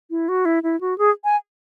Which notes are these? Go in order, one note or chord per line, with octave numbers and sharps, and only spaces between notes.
E4
F#4
E4
E4
F#4
G#4
G#5